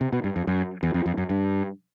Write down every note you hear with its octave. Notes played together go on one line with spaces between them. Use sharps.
C3
B2
G2
F2
F#2
E2
F2
F2
F#2
G2